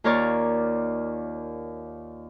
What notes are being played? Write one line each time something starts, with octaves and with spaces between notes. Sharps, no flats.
D#2 F4 A#4 C#5 D5